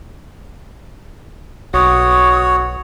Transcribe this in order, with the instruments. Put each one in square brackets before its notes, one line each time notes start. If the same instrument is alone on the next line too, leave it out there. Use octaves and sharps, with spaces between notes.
[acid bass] B1 [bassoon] F#4 [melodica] C#5 [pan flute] D#6